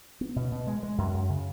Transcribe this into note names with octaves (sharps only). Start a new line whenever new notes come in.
B3
B2
B2
G#3
G#3
F#2
F#2
C#3